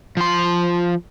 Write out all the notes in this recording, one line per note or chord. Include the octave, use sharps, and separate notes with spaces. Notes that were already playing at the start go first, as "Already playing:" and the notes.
F3 C6